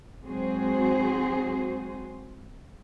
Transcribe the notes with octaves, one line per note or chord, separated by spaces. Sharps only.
G#2 F#3 C4 F#4 G#4 C5